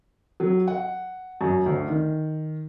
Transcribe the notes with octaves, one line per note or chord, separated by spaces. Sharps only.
F#3
F#5
F#2
D2
D#3